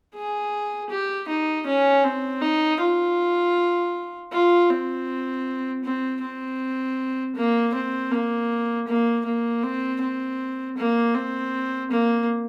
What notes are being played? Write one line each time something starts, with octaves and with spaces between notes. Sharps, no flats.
G#4
G4
D#4
C#4
C4
D#4
F4
F4
C4
C4
C4
A#3
C4
A#3
A#3
A#3
C4
C4
A#3
C4
A#3